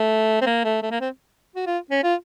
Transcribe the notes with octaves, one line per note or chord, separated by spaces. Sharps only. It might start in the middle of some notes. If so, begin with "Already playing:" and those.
Already playing: A3
C4
A#3
A3
A3
A#3
C4
F#4
F4
C#4
F4